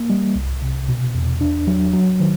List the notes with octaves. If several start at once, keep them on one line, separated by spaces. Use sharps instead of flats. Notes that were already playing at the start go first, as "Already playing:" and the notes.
Already playing: A#3
G3
C2
C3
B2
E2
D4
F#3
F#3
D#3